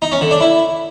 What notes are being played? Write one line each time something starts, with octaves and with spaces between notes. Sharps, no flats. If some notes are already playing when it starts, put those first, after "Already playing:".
D#4
C#4
D3
D4
E4